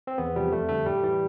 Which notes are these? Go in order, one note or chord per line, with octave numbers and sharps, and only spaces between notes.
C4
E2 B3
C3 F3 G3
F2 A3
D3 G3 A3
A2 G3
E3 G3